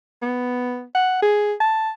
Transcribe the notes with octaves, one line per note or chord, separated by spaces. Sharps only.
B3
F#5
G#4
A5